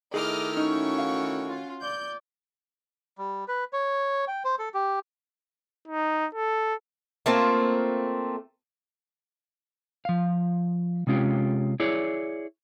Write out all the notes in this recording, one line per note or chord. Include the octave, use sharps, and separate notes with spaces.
D#3 A3 E4 G#4 D#5 D6 F6
C#4 D#4 F#4 C#6
F5
F4
D5 G6
G3
B4
C#5
G5
C5
A4
G4
D#4
A4
A3 A#3 C4 F4
F3 F5
C3 G#3 C#4 F4 G4
E4 G#4 C#5 D5